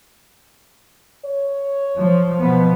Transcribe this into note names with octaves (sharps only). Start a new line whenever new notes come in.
C#5
F3
B2 F3 B3